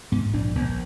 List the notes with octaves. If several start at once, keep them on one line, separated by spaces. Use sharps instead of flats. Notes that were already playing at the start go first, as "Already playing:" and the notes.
G#2 B3
A#1 D4
A#1 B3